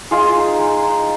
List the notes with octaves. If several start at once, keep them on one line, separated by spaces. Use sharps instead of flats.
G#3 F4 G#4
D#4
G#3
D#4